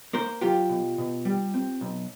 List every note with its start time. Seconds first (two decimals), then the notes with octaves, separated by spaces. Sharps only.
0.13 A#3 A#4 C5
0.41 F#3 F4 G4
0.69 B2
0.98 B2
1.25 G3
1.54 C4
1.81 B1